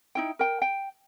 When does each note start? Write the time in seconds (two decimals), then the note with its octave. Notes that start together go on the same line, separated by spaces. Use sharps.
0.15 D#4 E4 G5
0.39 A#4 G5
0.62 G5